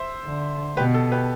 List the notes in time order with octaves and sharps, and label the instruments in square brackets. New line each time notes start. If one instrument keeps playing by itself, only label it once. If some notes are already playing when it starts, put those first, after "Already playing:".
Already playing: [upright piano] C5 E5
[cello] D3
[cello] B2 [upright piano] G4 B4
[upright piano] A4
G4 B4